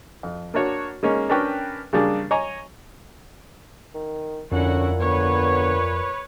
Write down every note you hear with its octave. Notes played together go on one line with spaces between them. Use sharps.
F2
A#3 D4 F#4 C#5
G#3 A#3 C#4 D#4
C#4 D4 A#4 B4 G5 C#6
C#3 G3 A#3 D4 G#4
C#5 D#5 G#5 A#5 C#6
D#3
F2 A#2 D3 C#4 E4 F#4 F#5
D3 B3 B4 C#5